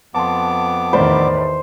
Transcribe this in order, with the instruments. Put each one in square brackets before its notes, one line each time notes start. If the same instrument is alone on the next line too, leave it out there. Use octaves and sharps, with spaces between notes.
[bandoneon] F2 B3 D6 [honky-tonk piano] A5 C6
[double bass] E2 D#3 [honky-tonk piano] A2 D5 B5 [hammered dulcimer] C5